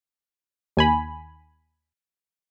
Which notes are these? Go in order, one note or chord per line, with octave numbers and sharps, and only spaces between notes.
D#2 G#5 B5